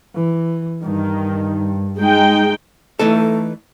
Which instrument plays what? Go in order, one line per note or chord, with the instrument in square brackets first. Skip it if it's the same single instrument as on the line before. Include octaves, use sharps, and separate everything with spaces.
[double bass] E3
[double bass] G2 [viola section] D#3
[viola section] G#3 D#4 G5
[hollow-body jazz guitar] E3 D#4 A4 [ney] A3